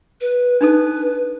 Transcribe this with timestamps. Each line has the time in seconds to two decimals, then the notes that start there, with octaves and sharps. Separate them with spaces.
0.21 B4
0.61 D4 D#4 A4 B4